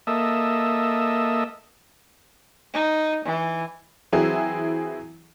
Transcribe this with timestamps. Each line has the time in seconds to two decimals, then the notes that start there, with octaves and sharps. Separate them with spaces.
0.07 A#3 A4 D#5 E5
2.74 D#4
3.25 E3
4.12 E3 F#3 C4 E4 G#4